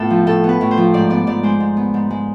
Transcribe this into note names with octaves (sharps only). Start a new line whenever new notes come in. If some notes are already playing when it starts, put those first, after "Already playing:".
Already playing: A2 B3 F4 A4
F3
A2 A4
B3
B4
A2
C5
F3
G#2 D5
B3 D5
G#2 D5
G#3 C5
G#2
B3
G#2
G#3